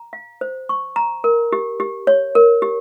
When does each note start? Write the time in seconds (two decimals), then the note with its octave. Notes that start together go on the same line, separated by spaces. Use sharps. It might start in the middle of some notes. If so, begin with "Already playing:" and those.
Already playing: A#5
0.13 F5
0.41 C5
0.69 C#6
0.96 A#5
1.24 A#4
1.52 G4
1.80 G4
2.07 C#5
2.35 A#4
2.62 G4